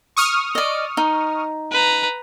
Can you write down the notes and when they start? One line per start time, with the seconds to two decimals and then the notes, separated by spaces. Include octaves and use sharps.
0.17 C#6 D#6 F6
0.55 D5 D#5
0.97 D#4
1.72 B4 A#5